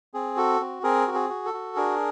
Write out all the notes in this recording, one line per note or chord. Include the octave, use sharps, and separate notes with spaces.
C4 G#4
F#4 A4
C4
C4 G#4 A#4
F#4
G#4
F#4
A4
F#4
D4 G#4 A#4